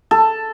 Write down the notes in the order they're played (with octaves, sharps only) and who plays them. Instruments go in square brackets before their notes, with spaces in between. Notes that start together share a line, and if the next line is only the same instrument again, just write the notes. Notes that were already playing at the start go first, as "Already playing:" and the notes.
[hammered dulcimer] A4